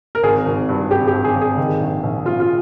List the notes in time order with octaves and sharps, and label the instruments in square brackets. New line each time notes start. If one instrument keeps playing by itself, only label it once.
[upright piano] A#4
G#1 G#4
G#1
G2
G#1 G4
G4
G#1
G#4
G#1
G#4
D#3
A#1
A#1
A#1 F4
F4